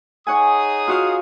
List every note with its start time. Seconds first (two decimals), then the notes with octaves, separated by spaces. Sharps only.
0.27 D#4 G#4 C#5 F#5 G#5 D#6
0.87 F4 F#4 F5